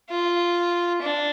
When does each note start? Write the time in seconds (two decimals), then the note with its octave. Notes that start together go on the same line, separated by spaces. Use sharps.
0.10 F4
1.02 D4